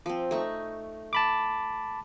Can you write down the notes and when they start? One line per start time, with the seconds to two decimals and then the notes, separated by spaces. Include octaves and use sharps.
0.06 F3 C4
0.31 A3 D#4 C#6
1.13 A5 B5 D6